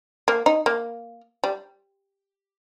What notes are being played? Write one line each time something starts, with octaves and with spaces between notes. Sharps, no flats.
A#3
D#4
A#3
G3